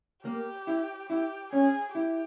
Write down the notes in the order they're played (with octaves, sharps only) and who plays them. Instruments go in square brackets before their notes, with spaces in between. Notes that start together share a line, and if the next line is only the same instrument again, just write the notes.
[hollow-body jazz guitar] A#3 [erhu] G4
[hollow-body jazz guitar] E4
[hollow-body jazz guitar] E4 [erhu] G4
[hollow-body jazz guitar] C#4 [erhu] G#4
[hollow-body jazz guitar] E4 [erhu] G4